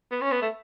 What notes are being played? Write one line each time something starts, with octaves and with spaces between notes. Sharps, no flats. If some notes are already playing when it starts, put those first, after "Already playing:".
B3
C#4
B3
A3